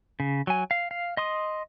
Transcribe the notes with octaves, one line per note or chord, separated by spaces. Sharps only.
C#3
F#3 G#5
F5
F5
D#5 C6 D#6